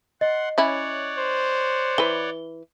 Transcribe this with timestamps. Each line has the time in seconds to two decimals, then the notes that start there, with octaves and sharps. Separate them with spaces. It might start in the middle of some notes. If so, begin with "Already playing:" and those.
0.21 D#5 F#5 C6
0.58 C#4 E4 C#5 D5 F#5
1.18 C5
1.98 E3 B4 G7